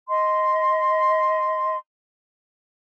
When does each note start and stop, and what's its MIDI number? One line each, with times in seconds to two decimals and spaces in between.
0.09 1.77 75
0.09 1.77 84